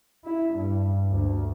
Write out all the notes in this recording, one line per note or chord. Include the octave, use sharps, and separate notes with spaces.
E4
G2
D2